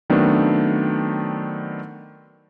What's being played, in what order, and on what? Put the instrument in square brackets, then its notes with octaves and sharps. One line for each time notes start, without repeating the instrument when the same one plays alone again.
[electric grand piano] D#3 F#3 A3 B3 C4 D4